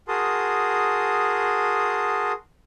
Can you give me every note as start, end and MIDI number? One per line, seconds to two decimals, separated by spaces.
0.08 2.32 66
0.08 2.32 68
0.08 2.32 70
0.08 2.32 81
0.08 2.32 84
0.08 2.32 87